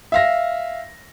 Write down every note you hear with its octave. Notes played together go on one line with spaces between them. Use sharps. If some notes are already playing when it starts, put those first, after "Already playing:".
E5 F5 A#6